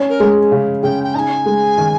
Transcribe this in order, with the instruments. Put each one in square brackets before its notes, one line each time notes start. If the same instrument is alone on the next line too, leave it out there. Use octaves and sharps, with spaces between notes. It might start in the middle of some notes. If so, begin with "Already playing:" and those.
Already playing: [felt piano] C#4
[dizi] A#4
[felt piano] G#3
C#3
[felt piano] C#3 [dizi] G5
[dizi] G5
[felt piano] D#4 [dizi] G#5 A#5
[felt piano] G#3
D#3